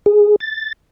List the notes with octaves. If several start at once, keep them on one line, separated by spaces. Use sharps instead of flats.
G#4
A6